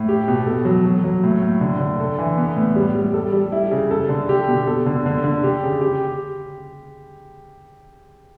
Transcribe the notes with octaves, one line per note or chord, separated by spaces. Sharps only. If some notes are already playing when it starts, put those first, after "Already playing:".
Already playing: A2
G4
B2
A4
F#3
F#3
F#3
A2
A2
D3
D3
A4
E3
B3
A2
G3
G3
A4
G3
E4
C#3
A4
D3
G4
B2
A4
D3
D3
D3
G4
C#3
G4